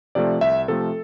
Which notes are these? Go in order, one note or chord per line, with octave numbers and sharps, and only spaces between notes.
C3 F3 A3 D5
C2 E5
C3 F3 A3 A4